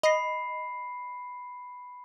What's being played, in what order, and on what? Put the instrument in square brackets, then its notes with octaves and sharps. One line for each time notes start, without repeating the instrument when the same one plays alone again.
[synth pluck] D#5 [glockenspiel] B5 C7